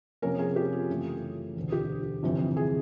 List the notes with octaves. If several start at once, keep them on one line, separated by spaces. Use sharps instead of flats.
F2 C3 F3 A#3 C#4 A#4
G#4
G4
F4
F#2 C#3 E3 A3
E1 D2 D3
G4
G1 F2 C3 E3
G#4